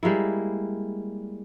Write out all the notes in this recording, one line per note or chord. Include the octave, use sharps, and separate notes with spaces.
G3 G#3 A#3 E4